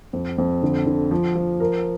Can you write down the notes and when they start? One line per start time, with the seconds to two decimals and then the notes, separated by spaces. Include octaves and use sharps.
0.13 F2
0.38 F2
0.63 D3
0.86 D3
1.11 F3
1.35 F3
1.60 A#4